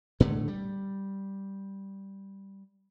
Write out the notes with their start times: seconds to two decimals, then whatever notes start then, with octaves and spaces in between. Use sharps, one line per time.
0.20 A2 D3 G#3 A3
0.48 G3